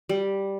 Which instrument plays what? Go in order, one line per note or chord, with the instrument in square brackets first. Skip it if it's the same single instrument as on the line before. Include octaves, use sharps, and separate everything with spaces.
[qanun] G3